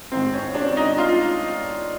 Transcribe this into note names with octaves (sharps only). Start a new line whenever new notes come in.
A1 G#2 D#3 C4
C#4
D4
D#4
F4